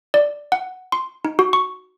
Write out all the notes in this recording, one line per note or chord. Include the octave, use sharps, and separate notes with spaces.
D5
F#5
C6
D#4
F#4
C#6